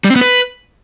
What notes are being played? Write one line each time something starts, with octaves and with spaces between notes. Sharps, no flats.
G3
C4
B3
B4